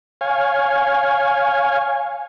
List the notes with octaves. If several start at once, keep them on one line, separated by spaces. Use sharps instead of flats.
C#5 F5 G#5